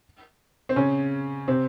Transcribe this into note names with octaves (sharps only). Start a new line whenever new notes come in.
C4
C#3 C#4
C3 C4